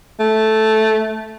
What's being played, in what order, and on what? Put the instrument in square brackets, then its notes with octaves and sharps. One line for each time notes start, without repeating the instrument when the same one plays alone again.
[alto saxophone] A3